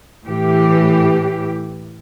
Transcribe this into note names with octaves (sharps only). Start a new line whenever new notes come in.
A2 E3 G4